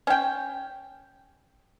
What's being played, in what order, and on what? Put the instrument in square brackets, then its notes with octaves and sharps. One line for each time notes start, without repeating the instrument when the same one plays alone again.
[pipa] C#4 G5